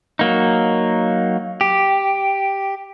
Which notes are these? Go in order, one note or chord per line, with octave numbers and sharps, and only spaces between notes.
F#3 A#3 D#4
G4